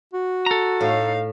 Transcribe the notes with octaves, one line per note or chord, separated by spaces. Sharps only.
F#4
A4 A#5
A2 D#4 F5